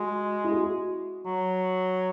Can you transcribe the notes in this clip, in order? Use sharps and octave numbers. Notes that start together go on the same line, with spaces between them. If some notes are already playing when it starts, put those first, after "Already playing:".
Already playing: G#3 F#4
E4
F#4
F#3